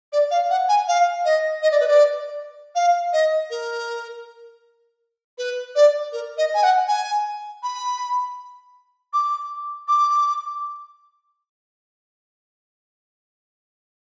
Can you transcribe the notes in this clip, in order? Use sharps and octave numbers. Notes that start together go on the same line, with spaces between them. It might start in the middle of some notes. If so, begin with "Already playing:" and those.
D5
F5
F#5
G#5
F5
D#5
D#5
D5
B4
D5
F5
D#5
A#4
B4
D5
A#4
D#5
G#5
F#5
G#5
B5
D6
D6